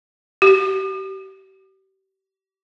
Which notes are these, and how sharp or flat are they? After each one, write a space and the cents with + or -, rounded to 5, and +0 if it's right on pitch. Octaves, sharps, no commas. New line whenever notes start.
G4 -35